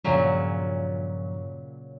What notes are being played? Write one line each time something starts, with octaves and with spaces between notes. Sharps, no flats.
G2 A#2 C#3 F3 F#3